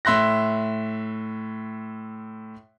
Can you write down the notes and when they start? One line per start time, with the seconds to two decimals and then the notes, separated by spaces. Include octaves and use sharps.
0.05 A2 E5 C6 F#6 A#6